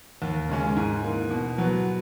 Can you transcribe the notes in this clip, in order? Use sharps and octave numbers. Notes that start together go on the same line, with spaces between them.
D#2
C#3 G#3 C#4
G#2
E3 A#3
B2
F#3 B3